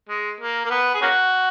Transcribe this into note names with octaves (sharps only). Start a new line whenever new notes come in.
G#3
A#3
A#3
B3
G#4
A#3 C#4 F#4